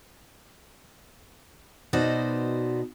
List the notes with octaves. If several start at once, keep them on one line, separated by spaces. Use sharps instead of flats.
B2 B3 D#4 F#4 C5 D5